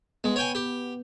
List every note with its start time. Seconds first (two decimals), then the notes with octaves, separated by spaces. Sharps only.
0.24 G#3 B3
0.36 C#5 G5 G#5
0.55 G4